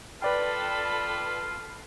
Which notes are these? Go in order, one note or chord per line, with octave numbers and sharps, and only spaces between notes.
F4 A4 B4 D5 G5 B5